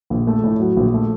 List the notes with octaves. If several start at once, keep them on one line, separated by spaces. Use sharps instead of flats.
A#1
A3
A2
F#3
A#1
A3